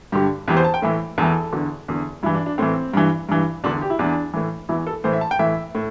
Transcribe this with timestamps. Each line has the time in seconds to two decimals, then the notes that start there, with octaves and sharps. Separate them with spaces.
0.12 G2 D3 G4
0.48 E2 E3 G4
0.57 C5
0.65 A5
0.74 G5
0.82 A2 E3 E5
1.18 E2 E3 A4
1.53 E2 D3
1.88 E2 D3
2.23 G2 E4
2.26 E3
2.35 D4
2.46 D4
2.58 A2 E3 C4
2.93 G2 E3
3.29 G2 E3
3.64 E2 D3 D4
3.81 G4
3.90 E4
3.99 E2 E3 D4
4.34 A2 E3
4.69 E2 E3 E4
4.87 A4
5.04 A2 E3 C5
5.13 E5
5.21 A5
5.31 G5
5.39 A2 E3 E5
5.75 A2